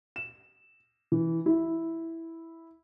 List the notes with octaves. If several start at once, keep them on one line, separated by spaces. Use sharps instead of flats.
E7
E3
E4